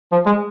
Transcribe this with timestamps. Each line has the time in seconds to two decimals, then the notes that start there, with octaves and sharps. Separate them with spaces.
0.12 F3
0.26 G#3